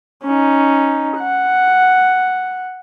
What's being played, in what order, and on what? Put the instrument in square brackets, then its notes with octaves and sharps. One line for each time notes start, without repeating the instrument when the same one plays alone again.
[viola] C#4 D#4
F#5